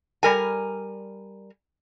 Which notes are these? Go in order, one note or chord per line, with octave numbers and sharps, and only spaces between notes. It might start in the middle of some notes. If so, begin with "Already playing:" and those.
G3 A#4 G#5